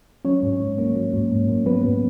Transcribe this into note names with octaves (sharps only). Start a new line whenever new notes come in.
F#3 C#4 C#5
G#2
G#2
A#3
F#3
G#2
G#2
A#3
F#3 B3 B4
G#2